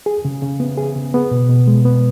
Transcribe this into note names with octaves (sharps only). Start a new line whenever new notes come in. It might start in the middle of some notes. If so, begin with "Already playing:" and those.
G#4
C#3
C#3
B3
G#4
C#3
B3
B2
B2
G#3
B3